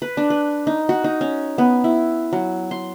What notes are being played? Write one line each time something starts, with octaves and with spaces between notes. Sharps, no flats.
B4
D4
B4
D#4
F#4
D#4
C#4
B3
E4
F#3
C6